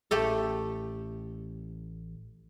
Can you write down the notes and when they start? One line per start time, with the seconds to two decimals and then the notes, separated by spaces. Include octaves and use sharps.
0.11 A1 A3 G4 A4